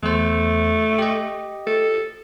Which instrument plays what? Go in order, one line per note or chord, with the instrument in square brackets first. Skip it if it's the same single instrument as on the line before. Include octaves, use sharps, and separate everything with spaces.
[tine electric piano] E2 C5 [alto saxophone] A3
[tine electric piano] G4 D#5
[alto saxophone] A4